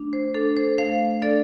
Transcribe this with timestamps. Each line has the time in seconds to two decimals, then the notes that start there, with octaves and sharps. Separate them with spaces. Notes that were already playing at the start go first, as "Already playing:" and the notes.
Already playing: A3 D4
0.13 C5
0.34 D4 A4
0.57 C5
0.78 A3 C5 F5
1.22 D4 A4 D5